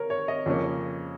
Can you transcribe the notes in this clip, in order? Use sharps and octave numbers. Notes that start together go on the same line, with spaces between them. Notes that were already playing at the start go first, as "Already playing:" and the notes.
Already playing: A#4 C#5
C#5
D#5
F2 C#3 A#3 C#4